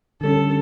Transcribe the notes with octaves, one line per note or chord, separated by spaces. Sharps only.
D3 G3 C#4 A4